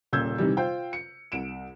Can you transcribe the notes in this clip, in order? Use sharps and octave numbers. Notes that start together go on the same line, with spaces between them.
D#1 A#2 C#3 E6 G6 G#6
C3 D#3 E3 G3
F4 C5 G5
C#7
C2 D7 E7